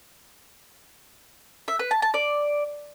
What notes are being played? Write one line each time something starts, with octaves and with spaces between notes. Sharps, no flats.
E5
B4
A5
A5
D5